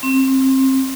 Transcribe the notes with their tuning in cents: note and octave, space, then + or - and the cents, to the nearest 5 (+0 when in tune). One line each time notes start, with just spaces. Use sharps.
C4 +25